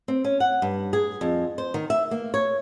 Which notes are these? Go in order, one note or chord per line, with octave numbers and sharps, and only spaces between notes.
C4
C#4
F#5
G2
G#4
F2
C5
D#3
E5
A#3
C#5